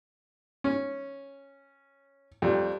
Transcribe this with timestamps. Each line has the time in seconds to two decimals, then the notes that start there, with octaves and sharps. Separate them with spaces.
0.64 C#4
2.42 F2 G3